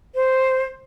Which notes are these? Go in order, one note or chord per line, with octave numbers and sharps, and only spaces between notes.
C5